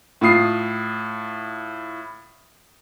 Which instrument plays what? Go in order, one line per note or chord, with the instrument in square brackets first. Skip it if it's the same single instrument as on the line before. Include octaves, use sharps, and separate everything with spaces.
[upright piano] A2 F4 D#6 C7